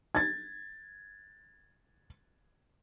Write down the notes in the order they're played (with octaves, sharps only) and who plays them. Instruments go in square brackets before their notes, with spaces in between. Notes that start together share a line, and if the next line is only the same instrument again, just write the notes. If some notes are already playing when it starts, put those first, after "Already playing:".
[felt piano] G#6 A6